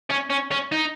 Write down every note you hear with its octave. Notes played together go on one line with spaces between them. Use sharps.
C#4
C#4
C#4
D#4